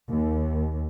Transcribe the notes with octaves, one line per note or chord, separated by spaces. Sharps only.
D#2